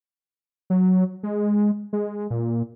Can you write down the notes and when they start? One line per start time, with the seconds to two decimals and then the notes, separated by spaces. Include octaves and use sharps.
0.70 F#3
1.23 G#3
1.93 G#3
2.30 A#2